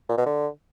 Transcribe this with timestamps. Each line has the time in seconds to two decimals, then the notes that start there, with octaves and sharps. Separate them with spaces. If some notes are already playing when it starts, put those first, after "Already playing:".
0.09 A#2
0.17 B2
0.26 D3